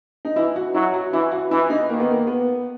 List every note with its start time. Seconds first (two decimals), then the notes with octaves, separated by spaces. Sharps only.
0.25 D#4
0.36 E3 E4
0.56 F#4
0.74 F#3 E4
0.94 F#4
1.12 E3 E4
1.31 F#4
1.51 E3 E4
1.70 D#4
1.89 D#3 A#3
2.00 B3
2.11 A#3
2.27 B3